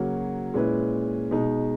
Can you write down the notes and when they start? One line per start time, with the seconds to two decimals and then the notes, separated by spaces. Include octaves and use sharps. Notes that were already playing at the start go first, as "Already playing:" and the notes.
Already playing: C#3 F#3 A#3 C#4 F#4
0.54 A#2 G#3 C#4 E4 B4
1.31 B2 G#3 D#4